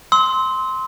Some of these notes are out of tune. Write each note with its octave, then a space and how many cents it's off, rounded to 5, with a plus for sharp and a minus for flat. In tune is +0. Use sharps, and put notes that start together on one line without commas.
C6 +0 E6 -40